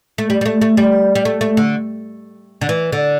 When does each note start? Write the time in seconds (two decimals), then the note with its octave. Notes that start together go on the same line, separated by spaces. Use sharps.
0.18 A3
0.30 G3
0.41 G3
0.46 A3
0.62 A3
0.77 G3
1.15 G3
1.25 A3
1.41 A3
1.57 D3
2.61 D3
2.69 E3
2.92 D3